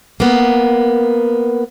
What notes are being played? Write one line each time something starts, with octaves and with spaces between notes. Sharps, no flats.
A#3 B3